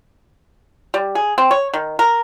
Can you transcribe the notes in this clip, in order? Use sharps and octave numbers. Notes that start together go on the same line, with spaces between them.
G3
G#4
C4
C#5
D#3
A#4